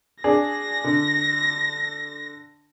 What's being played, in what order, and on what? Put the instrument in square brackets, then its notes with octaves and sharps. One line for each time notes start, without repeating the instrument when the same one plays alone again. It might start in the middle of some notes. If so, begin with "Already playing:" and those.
[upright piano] D4 G#4 [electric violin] A#6
[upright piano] D3